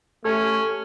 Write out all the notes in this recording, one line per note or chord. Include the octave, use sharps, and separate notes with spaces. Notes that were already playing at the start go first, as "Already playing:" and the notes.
A3 C#4 G4 A4